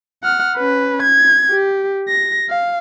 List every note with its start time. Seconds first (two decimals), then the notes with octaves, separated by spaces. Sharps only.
0.23 F#5 F6
0.57 C#4 B4
1.03 G#6
1.50 G4
2.09 A#6
2.49 F5